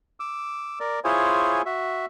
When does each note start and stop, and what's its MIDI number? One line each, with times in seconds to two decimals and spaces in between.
0.20 0.79 86
0.20 0.79 88
0.80 1.00 70
0.80 1.00 74
1.04 1.62 64
1.04 1.62 65
1.04 1.62 68
1.04 1.62 72
1.04 1.62 73
1.04 1.62 80
1.66 2.06 66
1.66 2.06 76